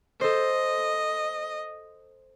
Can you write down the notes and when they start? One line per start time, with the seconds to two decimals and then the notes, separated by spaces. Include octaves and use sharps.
0.21 A4 C5 D#5